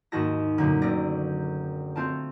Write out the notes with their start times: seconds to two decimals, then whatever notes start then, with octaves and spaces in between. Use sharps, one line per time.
0.12 D#2 G#2 F#4 A5 A#6
0.58 F#2 A#2 D3
0.82 F#1 A3 D5 A#6
1.96 A3 C4 F4 A5